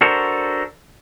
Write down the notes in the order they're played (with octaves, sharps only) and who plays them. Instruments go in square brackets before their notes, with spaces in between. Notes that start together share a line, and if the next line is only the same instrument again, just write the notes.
[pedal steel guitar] D4 F#4 A4 A#4 C5